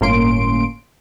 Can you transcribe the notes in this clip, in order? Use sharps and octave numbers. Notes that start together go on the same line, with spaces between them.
G1 A2 A#3 C#4 C6 D7